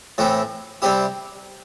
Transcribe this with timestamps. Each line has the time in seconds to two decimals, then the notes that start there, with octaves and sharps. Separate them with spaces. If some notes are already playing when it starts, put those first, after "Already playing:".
0.18 A2 E3 A3 C4 E4
0.82 C3 G3 C4 E4 G4